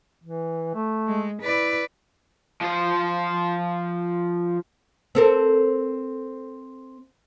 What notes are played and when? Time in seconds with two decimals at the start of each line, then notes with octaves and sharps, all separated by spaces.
0.24 E3
0.74 A3
1.07 G#3
1.42 E4 B4 D5
2.62 F3 C5
5.15 C4 A4 A#4